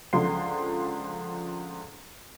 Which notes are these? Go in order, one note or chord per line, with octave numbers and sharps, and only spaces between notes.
C#2 D3 F3 C6